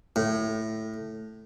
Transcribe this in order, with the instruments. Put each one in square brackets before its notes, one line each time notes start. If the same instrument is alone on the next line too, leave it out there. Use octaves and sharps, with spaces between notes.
[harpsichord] A2